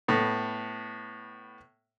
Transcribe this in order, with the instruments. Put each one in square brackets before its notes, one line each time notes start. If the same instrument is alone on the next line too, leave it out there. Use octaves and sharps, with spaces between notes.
[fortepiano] A2 B3